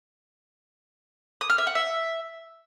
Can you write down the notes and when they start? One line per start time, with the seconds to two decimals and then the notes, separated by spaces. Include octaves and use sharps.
1.41 D#6
1.50 F6
1.58 E5
1.67 F#5
1.75 E5